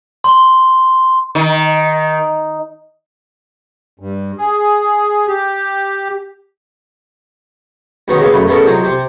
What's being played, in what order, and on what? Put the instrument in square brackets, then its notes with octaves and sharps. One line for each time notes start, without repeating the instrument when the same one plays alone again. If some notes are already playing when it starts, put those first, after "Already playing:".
[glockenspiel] C6
[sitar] D#3
[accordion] G2
G#4
G4
[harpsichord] G#2 B2 D#3 B3 C#4
C#3 G#3 A#3 B3
F#2 A2 C#3 B4 F5
G#3 A3 B3 C#4 A4 A#4
C3 F3 F#3 G#3
C3 C4 G4